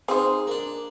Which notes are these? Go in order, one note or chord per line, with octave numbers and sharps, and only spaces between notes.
C4 D#4 F4 G#4 C5
A#3 D4